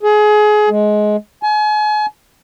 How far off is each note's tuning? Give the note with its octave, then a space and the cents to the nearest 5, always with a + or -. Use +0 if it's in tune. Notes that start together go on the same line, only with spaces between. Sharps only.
G#4 +25
G#3 +20
G#5 +35